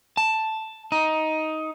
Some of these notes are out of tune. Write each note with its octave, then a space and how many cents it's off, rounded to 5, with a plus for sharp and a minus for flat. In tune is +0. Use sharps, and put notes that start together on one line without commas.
A5 +0
D#4 +10